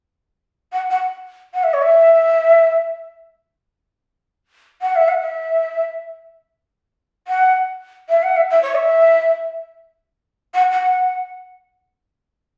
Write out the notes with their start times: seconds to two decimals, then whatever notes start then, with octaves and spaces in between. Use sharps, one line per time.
0.73 F#5
0.90 F#5
1.54 F#5
1.64 E5
1.74 C#5
1.83 E5
4.81 F#5
4.96 E5
5.08 F#5
5.22 E5
7.28 F#5
8.09 E5
8.23 F#5
8.36 E5
8.50 E5
8.62 C#5
8.75 E5
10.54 F#5
10.72 F#5